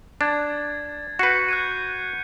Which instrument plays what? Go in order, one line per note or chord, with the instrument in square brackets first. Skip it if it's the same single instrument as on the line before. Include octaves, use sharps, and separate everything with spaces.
[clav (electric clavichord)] D4 [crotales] G#6 A6
[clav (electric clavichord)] F#4 B4 [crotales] G6 C7 C#7
[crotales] F#6 G#6 D#7